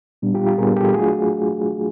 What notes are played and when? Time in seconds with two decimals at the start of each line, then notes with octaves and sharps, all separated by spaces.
0.22 A#2 G3 B3 D4
0.34 F4 G4
0.46 F4 G4
0.58 A#2 G3 B3 D4 G#4 A#4
0.76 G4 A4
0.94 F#3 A3 D4 F4 F#4 G#4